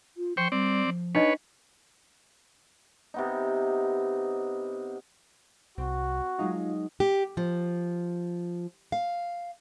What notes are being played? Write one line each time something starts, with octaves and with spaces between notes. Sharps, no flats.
F4
F3 C5 G5 C#6
G3 C4 D5
F3
D4 D#4 B4 C#5 D#5
C3 B3 D#4
C2 C4 F#4
F#3 G#3 D#4 F4
G4
F3
F5